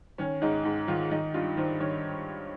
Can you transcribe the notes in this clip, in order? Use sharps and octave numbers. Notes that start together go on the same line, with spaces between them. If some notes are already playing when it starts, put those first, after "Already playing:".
D#3 C#4
G#2 D#4
G#2
D#3 F4
D#3 D#4
G2 F4
D#3 C5
D#3 C#5